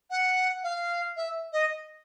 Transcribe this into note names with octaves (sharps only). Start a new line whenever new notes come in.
F#5
F5
E5
D#5